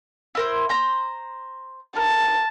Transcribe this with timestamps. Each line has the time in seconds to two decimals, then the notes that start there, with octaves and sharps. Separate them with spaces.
0.35 E4 A#4 C5
0.69 C5 A#5
1.96 A#4 A5